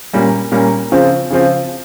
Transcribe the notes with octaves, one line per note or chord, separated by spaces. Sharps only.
A#2 G3 A#3 C#4
A#2 G3 A#3 C#4
C#3 F3 C4 F4
C#3 F3 C4 F4